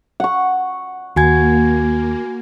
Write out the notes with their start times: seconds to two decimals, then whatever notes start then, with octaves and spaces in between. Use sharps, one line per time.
0.20 F#5 C#6
1.16 D#2 A#3 F#4 G#5 G#6